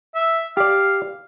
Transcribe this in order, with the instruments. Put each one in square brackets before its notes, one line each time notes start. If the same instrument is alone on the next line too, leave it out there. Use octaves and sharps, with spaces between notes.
[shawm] E5
[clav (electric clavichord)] G4 D5 [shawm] F5